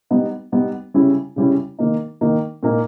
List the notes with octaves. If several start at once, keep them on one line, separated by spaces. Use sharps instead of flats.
G3 B3 D#4
G3 B3 D#4
C#3 G3 C#4 E4
C#3 G3 C#4 E4
D#3 A#3 D#4
D#3 A#3 D#4
A#2 A#3 D#4